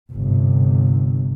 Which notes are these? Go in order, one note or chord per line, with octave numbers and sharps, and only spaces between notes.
G1 C3